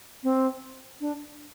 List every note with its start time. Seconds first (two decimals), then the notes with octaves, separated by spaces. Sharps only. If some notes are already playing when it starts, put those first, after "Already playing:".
0.23 C4
1.01 D4